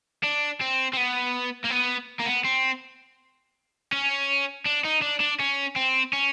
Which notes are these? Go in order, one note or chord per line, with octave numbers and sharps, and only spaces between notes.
D4
C4
C4
B3
A#3
B3
A#3
B3
C4
C#4
D4
D#4
D4
D4
C#4
C4
C#4